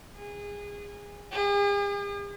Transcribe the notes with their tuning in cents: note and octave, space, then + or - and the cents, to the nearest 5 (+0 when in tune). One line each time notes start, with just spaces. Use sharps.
G#4 -25
G#4 -45